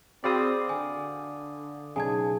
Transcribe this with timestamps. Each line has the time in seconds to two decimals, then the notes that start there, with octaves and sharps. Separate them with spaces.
0.24 C4 F#4 G#4 D5 F5 B5 D#6
0.69 D3 G#5
1.96 B1 C#3 D#4 G#4 G#5 A5 G#6